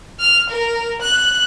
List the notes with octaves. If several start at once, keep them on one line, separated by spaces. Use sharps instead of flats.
F6
A#4
F#6